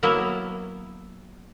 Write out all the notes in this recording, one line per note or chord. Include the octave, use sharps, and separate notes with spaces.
F#3 A#3 B3 E4 E5